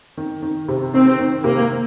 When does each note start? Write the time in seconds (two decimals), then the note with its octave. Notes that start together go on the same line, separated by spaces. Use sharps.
0.17 D#3
0.42 D#3
0.68 C3
0.94 D#3 C4
1.19 D#3
1.44 C3 A#3